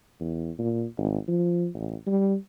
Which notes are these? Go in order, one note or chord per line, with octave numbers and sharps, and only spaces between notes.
E2
A#2
G#1
F3
A1
G3